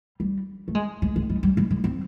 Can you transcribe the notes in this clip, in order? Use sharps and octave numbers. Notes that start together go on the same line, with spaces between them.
G3
A3
G#3
G#3
G#3
G3
G3
G3
G#3
C4